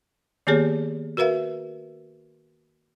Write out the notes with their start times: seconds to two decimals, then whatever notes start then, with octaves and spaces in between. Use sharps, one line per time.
0.47 D#3 A#3 B3 G4 G#4 C#5
1.17 F#4 A#4 B4 E5 F5